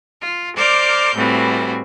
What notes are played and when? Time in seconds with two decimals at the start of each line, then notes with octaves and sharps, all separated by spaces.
0.22 F4
0.56 A#4 C5 D5 D6 F6 G6
1.14 A2 E3 G3 C4 F#4